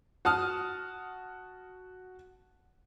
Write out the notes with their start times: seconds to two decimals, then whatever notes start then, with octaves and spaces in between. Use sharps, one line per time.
0.25 F#4 A5 D#6 F6